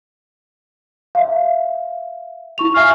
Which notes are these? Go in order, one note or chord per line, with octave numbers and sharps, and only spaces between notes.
E5 F5
E4 C#6 F7
E5 F5 G#5 C#6